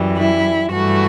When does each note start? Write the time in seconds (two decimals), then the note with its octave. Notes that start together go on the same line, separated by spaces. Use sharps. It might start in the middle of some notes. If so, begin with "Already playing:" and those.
Already playing: F#2 E3 G3
0.19 E4
0.71 G2 E3 A3 F#4